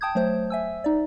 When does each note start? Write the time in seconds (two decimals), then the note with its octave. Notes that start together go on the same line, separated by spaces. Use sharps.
0.01 G5 A5 D#6 G6 G#6
0.15 F#3 A3 C5 G6
0.50 E5 G#5 E6
0.84 D#4 D5